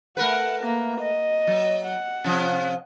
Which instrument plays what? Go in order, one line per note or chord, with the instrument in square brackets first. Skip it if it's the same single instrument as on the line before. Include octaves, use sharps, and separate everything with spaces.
[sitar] A3 A#4 B4 [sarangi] F#5
[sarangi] A#3
D#5
[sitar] F#3
[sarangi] F#5
[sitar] C3 F3 C#4